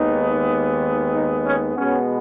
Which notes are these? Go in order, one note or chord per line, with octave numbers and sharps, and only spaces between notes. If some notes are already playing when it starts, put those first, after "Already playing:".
Already playing: D#2 D#3 G#3 B3 D#4
D#4
C#4
B2 G#3 B3 C#4